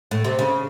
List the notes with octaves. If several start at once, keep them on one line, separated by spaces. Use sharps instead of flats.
A2
C3
C#3